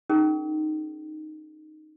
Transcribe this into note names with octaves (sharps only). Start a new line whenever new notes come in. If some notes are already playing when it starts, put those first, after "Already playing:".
C#4 D#4 G#4 A#4